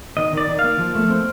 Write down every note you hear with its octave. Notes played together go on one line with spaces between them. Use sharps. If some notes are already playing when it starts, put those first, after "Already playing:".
D#3 D#5
D#3 D5
D#3
A#3 F5
F3
A3
C4